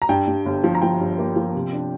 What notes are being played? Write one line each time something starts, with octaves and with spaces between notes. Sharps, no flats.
A#5
G2 G5
G2
G1
F3
A#5
F3 G5
G2
A#3
F3
C3
D4